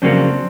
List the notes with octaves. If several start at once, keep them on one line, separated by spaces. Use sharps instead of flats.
F2 C#3 F#3 A#3 C4 D4